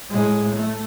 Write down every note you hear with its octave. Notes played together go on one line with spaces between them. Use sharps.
A2 G#3
A3